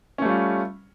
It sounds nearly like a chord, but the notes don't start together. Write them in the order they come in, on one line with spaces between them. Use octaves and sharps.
C#4 A3 G3 F4